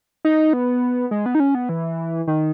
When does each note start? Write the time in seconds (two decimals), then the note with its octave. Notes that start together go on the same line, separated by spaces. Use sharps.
0.25 D#4
0.53 B3
1.11 G#3
1.26 B3
1.35 D#4
1.40 C#4
1.55 B3
1.69 E3
2.27 D#3